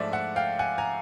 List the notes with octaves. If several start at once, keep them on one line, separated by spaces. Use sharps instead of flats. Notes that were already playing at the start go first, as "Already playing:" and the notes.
Already playing: G#2 F3 A3 D4 D5 E5
E5 F#5
F5 G5
F#5 G#5
G#5 A#5